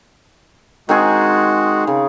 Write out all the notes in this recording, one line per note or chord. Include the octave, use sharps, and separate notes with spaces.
D#3 G#3 C4 F#4 G#4
C#3